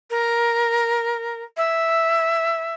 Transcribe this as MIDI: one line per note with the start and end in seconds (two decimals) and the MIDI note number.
0.10 1.42 70
1.57 2.75 76